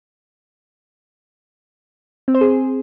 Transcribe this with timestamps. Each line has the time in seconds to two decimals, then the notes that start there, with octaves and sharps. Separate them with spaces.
2.28 C4
2.35 C5
2.41 G#4